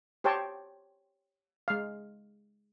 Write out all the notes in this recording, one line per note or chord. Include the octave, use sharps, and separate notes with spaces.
G4 C5 C#5 G5 A5
G#3 F5